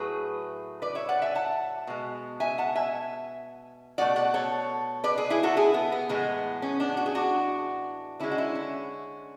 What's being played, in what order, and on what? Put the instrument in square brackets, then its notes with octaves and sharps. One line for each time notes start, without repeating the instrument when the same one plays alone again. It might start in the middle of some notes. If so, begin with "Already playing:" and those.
Already playing: [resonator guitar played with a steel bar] A2 F#3 A3 G#4 B4
B4 D5
C#5 E5
D5 F#5
E5 G#5
F#5 A5
B2 G#3
E5 G#5
F#5 A5
E5 G#5
B2 A3 D5 F#5
D5 F#5
A4 C#5
B4 D5
G#4 B4
E4 G#4
F#4 A4
E4 G#4
B3
B3
A2 E3 G#3 B3
C#4
B3 D4
F#4
G#4
D4 F#4
D3 G#3 C#4 E4
F#4
C#4 E4
C#4